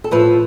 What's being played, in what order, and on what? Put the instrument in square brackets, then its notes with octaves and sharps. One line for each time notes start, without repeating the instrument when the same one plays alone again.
[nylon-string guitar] A4
A2 F3 A3 B4